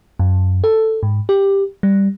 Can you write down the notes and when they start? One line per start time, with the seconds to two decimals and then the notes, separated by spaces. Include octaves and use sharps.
0.20 F#2
0.64 A4
1.03 G#2
1.29 G4
1.83 G3